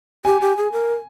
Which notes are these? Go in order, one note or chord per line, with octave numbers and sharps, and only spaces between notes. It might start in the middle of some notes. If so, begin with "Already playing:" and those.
G4 G#5
G4
G#4
A#4